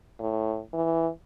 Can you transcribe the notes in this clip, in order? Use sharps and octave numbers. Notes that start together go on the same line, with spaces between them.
A2
E3